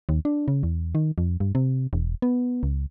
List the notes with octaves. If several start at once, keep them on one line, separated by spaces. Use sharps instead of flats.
D#2
D4
C#3
E2
D#3
F2
G2
C3
E1
B3
C#2